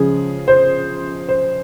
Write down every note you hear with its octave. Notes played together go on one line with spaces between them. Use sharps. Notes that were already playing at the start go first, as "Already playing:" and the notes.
Already playing: C#3 F3 G#3 C#4 G#4
C5
C5